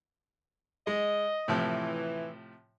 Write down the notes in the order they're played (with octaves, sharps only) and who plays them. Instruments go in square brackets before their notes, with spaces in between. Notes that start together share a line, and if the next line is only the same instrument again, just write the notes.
[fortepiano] G#3 [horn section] D#5
[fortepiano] A2 C3 F3 [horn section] E3